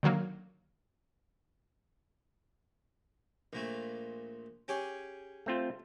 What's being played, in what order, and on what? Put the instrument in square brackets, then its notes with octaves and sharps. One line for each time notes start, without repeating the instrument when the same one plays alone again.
[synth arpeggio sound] D3 D#3 F#3 A#3
[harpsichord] A#1 A#2 A3
C#4 G4 G#4
[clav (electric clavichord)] A3 C4 F4